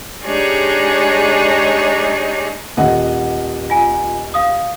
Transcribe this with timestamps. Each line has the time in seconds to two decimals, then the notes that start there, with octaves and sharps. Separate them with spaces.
0.24 G#3 D4 D#4 G4 G#4 C#5
2.77 D#1 D#5 F#5
3.70 F4 G#5
4.34 F5 D#6